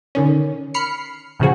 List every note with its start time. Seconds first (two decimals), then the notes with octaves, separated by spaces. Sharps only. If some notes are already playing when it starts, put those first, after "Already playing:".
0.15 D3 D#3 C#4
0.74 B5 F6 C7 C#7
1.40 A2 C#3 F3 F#4 G#4